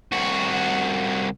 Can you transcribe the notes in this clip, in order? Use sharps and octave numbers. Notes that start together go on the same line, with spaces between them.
C2 F#4